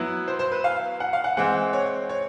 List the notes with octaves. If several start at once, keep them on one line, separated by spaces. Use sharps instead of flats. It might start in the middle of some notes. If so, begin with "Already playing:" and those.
Already playing: F#3 B3 E4
C5
C5
B4
F5
F#5
F5
F#5
E3 G#3 C4 F#5
C#5
C#5